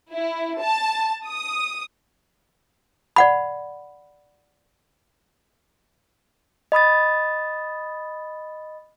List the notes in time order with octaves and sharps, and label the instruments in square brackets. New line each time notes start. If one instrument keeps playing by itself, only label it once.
[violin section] E4
A5
D#6
[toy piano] D5 F#5 B5
[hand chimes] D#5 B5 D#6 A6